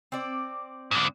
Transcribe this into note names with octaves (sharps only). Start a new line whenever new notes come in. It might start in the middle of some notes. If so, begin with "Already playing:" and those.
C4 D5
G#2 D3